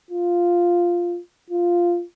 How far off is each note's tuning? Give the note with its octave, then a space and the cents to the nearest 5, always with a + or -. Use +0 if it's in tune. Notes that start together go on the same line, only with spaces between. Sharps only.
F4 +0
F4 -5